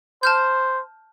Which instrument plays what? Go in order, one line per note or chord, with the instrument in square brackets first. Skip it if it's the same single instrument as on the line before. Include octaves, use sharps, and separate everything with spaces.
[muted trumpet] C5 [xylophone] A5 F6 G6